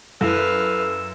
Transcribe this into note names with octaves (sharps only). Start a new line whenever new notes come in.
F#2 E4 A4 B4 F5 E6